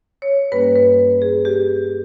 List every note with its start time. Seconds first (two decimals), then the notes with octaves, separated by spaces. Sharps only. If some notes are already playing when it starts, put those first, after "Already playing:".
0.22 C#5
0.52 G2 G3 A#3 C#4 B4
0.76 B4
1.22 G#4
1.45 G4